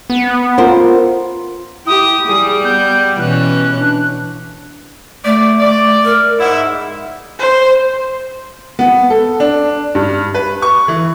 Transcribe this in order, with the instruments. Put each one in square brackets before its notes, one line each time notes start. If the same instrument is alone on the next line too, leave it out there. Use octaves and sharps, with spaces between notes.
[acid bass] B3
[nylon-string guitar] F4 A#4 C5
[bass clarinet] E4 [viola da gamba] G4 [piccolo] D#6
[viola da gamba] G3 [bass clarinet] G#4
[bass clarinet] B3 [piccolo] G6
[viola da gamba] B2 E3 C#4 [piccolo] F#6
[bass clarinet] D4
[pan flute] A3 [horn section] D5
[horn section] D5
[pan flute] A#4
[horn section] G#2 E4 [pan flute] F#5
[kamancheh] C5
[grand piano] B3
A4
D4
G2
B4
C#6
E3